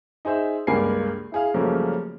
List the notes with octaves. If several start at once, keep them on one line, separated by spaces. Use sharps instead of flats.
D#4 G#4 C5 E5
C#2 G2 A#3 A#4 G#5 C7
E4 G#4 F5
F#2 C#3 F3 G3 A3 A#3